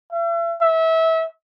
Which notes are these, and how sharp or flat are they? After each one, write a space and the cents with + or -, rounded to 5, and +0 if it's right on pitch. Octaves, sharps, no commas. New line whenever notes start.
E5 +40
E5 -25